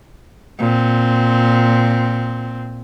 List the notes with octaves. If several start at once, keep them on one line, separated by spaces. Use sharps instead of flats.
A#2 C4